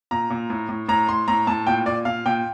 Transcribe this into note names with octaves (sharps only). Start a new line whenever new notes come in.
A#2 A#5
A#2
A2
A2
A2 A#5
A2 C6
A2 A#5
A2 A5
A#2 G5
A#2 D5
A#2 F5
A#2 G5